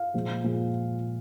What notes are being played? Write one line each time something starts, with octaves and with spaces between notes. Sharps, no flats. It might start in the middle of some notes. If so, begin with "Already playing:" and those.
Already playing: F5
A#2 F3 G#3
A#2 F3 G#3